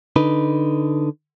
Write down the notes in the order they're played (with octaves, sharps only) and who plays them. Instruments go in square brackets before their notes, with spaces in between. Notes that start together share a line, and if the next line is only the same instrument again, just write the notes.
[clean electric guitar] D3 D#4 B4